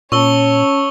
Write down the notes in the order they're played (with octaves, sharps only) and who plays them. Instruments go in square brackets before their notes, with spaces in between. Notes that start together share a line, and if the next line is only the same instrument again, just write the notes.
[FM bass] A#2 [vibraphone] C#4 A5 [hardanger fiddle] C#5 [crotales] C#6 E6 G7